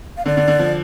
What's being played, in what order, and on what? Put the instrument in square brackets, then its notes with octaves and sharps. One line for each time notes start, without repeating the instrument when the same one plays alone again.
[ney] F5
[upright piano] D3 [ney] D5
[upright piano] D3
D3
F3